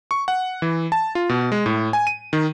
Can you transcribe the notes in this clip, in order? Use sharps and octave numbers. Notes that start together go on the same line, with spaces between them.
C#6
F#5
E3
A5
F4
B2
G#3
A2
G#5
D#7
D#3